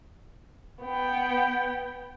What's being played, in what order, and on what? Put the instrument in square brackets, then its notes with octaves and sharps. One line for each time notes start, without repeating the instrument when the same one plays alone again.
[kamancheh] B3 G5